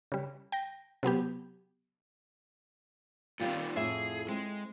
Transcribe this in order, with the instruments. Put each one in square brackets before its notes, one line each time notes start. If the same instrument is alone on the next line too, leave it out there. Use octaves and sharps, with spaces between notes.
[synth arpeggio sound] C#3 G3
G5 A#6
C3 F#3 B3 G4
[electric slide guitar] A#2 D#3 G3 [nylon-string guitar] C4 F4 G4
[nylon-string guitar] F2 A2 E5 [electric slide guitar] G#4
[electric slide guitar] G#3 [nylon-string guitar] C4